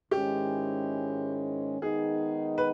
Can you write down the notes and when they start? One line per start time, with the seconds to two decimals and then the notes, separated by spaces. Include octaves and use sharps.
0.11 G#2 D#3 G#3 C#4 E4 G4
1.81 D#3 G#3 B3 D#4 G#4
2.58 B4